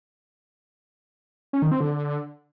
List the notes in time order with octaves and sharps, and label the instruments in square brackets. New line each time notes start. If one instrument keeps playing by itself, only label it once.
[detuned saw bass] C#4
D#3
C4
D3